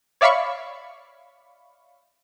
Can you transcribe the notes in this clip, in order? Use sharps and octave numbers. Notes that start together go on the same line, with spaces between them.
C#5 D5 E5 F5 B5 C#6